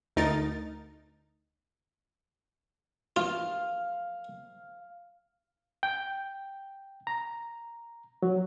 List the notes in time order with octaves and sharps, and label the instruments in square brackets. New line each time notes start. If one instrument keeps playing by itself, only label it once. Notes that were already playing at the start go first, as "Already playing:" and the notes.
[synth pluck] D2 D#4 A#4 A6
[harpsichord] F4 [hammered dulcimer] F5
[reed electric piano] G5
A#5
F#3